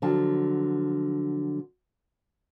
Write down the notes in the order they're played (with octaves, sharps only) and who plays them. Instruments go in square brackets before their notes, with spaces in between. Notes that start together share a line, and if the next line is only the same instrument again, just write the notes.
[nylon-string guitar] D3 F3 F#3 A5